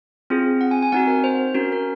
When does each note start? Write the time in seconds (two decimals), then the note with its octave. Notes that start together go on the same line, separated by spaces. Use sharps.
0.30 C4 F4 G#4
0.61 F#5
0.71 G#5
0.82 G#5
0.92 C4 D#4 F#4 F#5
1.07 A#4
1.24 C5
1.55 C#4 F#4 A#4
1.72 A#4